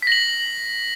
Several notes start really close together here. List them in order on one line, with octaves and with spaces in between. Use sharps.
B6 A#6 F#7